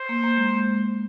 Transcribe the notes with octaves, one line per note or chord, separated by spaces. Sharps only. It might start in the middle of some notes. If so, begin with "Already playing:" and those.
Already playing: C5
A#3
A#3
G#3